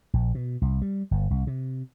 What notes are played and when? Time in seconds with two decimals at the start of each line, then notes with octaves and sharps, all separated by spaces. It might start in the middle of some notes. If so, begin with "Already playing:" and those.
0.13 A#1
0.35 B2
0.62 C2
0.82 G3
1.11 G1
1.30 C2
1.47 C3